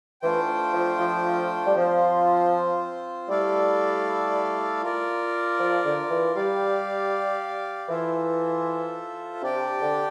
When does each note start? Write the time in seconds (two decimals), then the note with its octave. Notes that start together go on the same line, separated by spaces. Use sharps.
0.22 E3 A3 D4 F4 C5 G5
0.73 F3
0.99 F3
1.65 G3
1.75 F3 C4 F4 C5
3.28 G3 A3 E4 A4 D5 F5
4.82 F4 A#4 D5
5.58 F3
5.84 D3
6.10 E3
6.35 G3 G4 D5 F5
7.89 E3 F4 A4 C5 E5
9.41 C3 D4 G4 D5 G5
9.80 D3